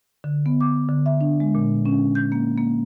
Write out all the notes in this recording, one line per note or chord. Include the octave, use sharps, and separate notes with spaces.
D3
B3
D6
D3
E5
D4
G#3
A#2
C#4
G6
A#3
A#3